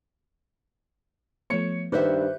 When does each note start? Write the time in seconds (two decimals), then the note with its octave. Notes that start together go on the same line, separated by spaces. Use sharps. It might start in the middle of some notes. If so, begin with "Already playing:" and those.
1.50 F3 A3 B3 C#5 C#7
1.92 G2 D#3 G4 B4 C5 E5 F#6 G6